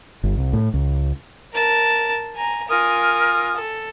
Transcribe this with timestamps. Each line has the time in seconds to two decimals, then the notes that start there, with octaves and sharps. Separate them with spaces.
0.23 G1
0.38 C2
0.53 A2
0.74 C#2
1.53 A#4 A5
2.36 G#5 A#5
2.69 F4 A#4 G#5 D#6 F6
3.56 A4